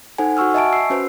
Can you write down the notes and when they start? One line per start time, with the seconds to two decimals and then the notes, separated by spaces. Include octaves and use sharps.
0.18 D#4 A4 C5 F#5 G#5
0.37 F#4 F#5 C#6 E6 F6
0.54 D#5 E5 G#5 A5 C#6 D7
0.73 E6 C7
0.90 C#4 F#4 B4 C5